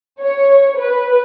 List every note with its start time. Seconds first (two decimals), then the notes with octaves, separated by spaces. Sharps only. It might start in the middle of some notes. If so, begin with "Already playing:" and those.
0.21 C#5
0.78 B4